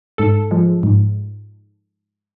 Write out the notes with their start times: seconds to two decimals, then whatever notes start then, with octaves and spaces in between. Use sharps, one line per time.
0.18 G#2 A4
0.51 F3 G#3
0.83 G#2